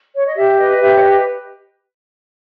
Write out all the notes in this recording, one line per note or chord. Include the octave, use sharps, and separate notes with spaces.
C#5
D#5
G4 E5
B4 D#5
D#5
G4 E5
C#5
B4 D#5